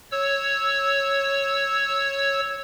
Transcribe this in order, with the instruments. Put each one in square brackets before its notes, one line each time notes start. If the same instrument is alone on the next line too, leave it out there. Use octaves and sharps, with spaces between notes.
[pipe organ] C#5 E6